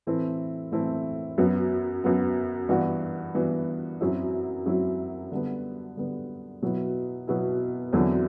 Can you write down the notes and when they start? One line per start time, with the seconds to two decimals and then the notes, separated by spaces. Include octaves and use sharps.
0.07 A2 E3 A3 C4 E4
0.72 A2 E3 A3 C4 E4
1.38 F#2 F#3 B3
2.04 F#2 F#3 B3
2.69 G2 E3 B3 F#4
3.34 G2 E3 B3 F#4
4.01 F#2 F#3 C4 E4
4.65 F#2 F#3 C4 E4
5.32 D3 G3 B3
5.97 D3 G3 B3
6.62 B2 F#3 B3 E4
7.28 B2 F#3 B3 E4
7.93 E2 D3 F#3 C4 E4